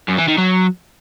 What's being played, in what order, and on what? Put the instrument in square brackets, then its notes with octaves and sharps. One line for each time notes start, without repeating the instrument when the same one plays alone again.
[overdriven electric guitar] F#2
E3
D#3
F#3